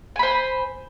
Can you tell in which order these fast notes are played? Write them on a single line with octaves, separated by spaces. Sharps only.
G#5 B5 C5